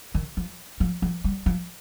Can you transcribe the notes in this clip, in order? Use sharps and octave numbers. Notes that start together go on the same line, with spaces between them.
D#3
F3
F3
F3
G3
F3